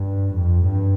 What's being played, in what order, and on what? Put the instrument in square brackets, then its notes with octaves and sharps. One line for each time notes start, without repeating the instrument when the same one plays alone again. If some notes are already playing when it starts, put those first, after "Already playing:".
Already playing: [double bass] G2
F2
G2